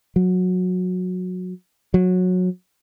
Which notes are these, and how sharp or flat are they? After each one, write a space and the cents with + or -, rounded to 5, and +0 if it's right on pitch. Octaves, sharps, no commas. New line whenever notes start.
F#3 -20
F#3 -20